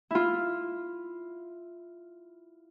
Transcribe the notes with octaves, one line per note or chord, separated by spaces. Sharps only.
E4 F4